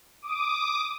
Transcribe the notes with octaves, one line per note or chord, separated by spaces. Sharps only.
D6 D#6